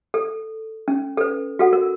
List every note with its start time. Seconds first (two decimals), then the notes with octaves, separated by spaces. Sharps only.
0.14 A4
0.88 C#4
1.17 A4 B4
1.59 F#4 A4 F#5
1.73 A#4